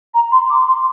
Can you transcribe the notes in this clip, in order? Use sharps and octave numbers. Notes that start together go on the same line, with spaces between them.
A#5
C6
D6
C6